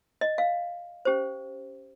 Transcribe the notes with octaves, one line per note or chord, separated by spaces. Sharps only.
D#5
F5
C#4 G4 C5